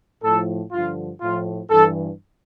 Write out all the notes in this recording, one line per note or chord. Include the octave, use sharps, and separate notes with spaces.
A2 F3 A4
G2 D3 F3 F4
A2 F3 F4
G2 E3 A4